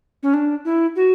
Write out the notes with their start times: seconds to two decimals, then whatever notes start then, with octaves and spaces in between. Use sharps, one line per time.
0.23 C#4
0.34 D4
0.65 E4
0.96 F#4